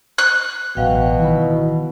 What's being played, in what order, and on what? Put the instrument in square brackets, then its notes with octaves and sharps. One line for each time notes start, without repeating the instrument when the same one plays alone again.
[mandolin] F#6
[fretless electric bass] A1 [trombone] B2 [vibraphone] F#3 F5 G5
[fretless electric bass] D#3 E3 [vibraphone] E4 B5